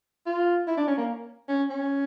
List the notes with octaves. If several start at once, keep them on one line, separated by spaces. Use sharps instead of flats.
F4
E4
D4
C#4
A#3
C#4
C#4